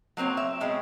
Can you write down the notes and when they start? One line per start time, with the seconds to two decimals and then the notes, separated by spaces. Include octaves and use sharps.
0.17 F#3 A#3 C4 C#5
0.37 E5
0.61 B2 G#3 C4 C#4 E4